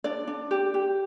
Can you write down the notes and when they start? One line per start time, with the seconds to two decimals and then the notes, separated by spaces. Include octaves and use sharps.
0.04 D4 D5
0.27 D4
0.51 G4
0.74 G4